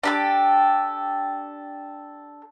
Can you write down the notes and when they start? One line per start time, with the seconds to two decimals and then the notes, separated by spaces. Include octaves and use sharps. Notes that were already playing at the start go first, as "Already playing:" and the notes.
0.04 D4 G4 A4